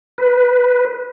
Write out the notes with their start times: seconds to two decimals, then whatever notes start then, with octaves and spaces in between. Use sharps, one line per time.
0.18 B4